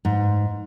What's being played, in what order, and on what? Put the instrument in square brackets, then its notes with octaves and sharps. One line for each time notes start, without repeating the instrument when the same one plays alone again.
[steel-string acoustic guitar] G#2